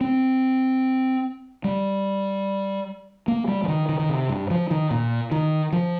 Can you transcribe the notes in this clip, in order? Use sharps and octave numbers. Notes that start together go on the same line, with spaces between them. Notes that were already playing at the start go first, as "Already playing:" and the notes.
C4
G3
A#3
G3
F3
D#3
D#3
D#3
C3
G2
F3
D#3
A#2
D#3
F3